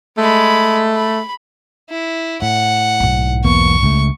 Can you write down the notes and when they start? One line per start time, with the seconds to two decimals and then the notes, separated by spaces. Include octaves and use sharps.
0.18 G#3 A3 B5
0.96 B5
1.90 E4
2.42 A2 F#5
3.00 B1 G#2
3.45 E2 A#3 B3 C#6
3.83 C#2 A3